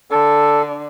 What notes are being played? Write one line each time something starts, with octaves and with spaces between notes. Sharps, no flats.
D3 A4